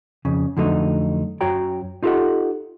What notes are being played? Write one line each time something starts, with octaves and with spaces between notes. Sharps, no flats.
F2 C#3
F2 D3 F#3 A3 D#4
F#2 F#3 F#4 C#5 G5 A#5
D#4 F4 G4 A4 D#5 F#5